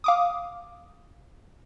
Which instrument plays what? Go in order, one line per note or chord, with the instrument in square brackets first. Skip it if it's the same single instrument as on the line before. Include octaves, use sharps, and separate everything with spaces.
[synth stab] F5 D6 D#6